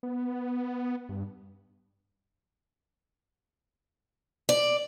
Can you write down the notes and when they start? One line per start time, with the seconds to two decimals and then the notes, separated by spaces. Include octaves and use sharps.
0.03 B3
1.09 G2
4.49 D5